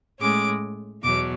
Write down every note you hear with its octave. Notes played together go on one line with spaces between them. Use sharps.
A2 G#3 C#4 D6
E2 B2 F#3 D6